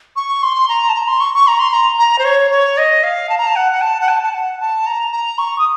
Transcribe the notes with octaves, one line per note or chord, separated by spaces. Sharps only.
C#6
C6
A#5
A5
A#5
C6
C#6
C#6
A#5
C6
A#5
A#5
C5
C#5
C#5
D#5
F5
A5
A#5
A5
F#5
F#5
A5
F#5
A5
A5
F#5
A5
A#5
A#5
C#6
D#6